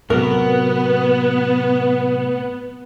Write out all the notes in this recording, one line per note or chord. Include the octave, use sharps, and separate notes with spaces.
A2 C3 F#3 B3 A#4